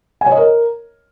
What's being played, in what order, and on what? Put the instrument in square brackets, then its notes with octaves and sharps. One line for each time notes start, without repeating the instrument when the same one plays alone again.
[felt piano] G#5
C#5
D#5
A#4